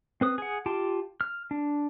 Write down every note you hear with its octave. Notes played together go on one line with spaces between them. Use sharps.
C4 B4 D#6
G#4 F#5
F4 G4 G5 A5
F6
D4